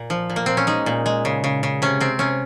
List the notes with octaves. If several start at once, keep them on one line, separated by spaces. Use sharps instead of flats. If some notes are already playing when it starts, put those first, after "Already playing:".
Already playing: A#2
F3
A#2
A#3
A#2 C4
C#4
G#3 D#4
A#2
G#3
C#3
C#3
C#3
C3 C#4
C3 C4
C3 C#4